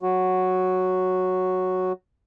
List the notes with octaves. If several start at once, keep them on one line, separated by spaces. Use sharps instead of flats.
F#3 F#4